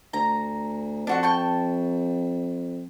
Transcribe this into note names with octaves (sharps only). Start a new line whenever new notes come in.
D2 A#5
F2 D4 F#4 C#6
G5 A5 C#6